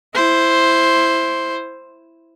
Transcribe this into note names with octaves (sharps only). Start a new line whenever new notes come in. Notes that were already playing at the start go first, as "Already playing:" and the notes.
E4 C5